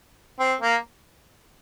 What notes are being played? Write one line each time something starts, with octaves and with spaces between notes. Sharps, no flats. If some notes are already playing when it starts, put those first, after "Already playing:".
C4
A#3